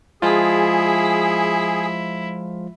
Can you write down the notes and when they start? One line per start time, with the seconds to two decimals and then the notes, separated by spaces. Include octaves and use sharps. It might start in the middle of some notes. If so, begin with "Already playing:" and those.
0.22 F3 G#3 E4 F4 G#4